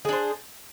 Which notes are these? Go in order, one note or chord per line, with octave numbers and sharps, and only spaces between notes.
D4 G#4 C5